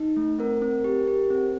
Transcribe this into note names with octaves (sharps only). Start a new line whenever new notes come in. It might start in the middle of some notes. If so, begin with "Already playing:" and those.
Already playing: D#4
A3
C4 A#4
C4
G4
G4
C4